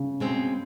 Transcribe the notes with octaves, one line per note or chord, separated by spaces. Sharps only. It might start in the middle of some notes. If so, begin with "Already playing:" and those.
Already playing: C#3
B2 G#3 C4